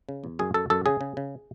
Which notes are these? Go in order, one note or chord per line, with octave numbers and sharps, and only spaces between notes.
C#3
E2
F#2 G#4
F#2 A4
F#2 A4
C#3 G#4
C#3
C#3